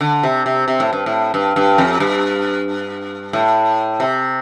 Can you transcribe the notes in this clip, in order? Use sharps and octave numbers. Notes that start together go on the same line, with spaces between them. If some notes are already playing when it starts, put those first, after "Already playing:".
D3
C3
C3
C3
A2
G2
A2
G2
G2
F2
G2
A2
C3